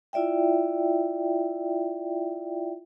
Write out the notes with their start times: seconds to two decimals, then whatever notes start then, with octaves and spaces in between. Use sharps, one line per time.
0.13 E4 F4 D5 E5 G5